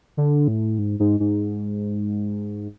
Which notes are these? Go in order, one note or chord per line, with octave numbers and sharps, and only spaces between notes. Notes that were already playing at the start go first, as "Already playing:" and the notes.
D3
A2
G#2
G#2
G#2